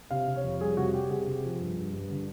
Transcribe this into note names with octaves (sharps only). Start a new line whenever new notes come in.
C3 F5
C3
C#5
F2
G3 G#4
C3 F#4
G3 G4
C3 G#4
C3
F3
G2
G2
G2
D3